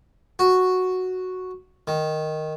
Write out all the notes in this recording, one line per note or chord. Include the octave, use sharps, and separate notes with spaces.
F#4
D#3